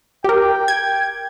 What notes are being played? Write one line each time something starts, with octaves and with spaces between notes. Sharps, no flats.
G4 A#4 G5
G#6